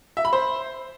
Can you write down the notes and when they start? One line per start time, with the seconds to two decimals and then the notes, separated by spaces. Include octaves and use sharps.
0.17 E5
0.25 B5
0.33 C5